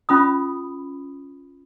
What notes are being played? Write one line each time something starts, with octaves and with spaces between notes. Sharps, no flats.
C#4 F4 B5 D#6